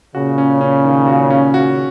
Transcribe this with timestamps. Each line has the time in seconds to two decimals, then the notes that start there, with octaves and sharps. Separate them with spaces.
0.14 A#2 C#3 F#4
0.38 C#4
0.61 C#4
0.85 D#3
1.07 F#4
1.30 C#4
1.54 F#4